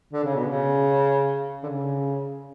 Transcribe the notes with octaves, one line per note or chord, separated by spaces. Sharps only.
D3
C#3
B2
C#3
D3
C#3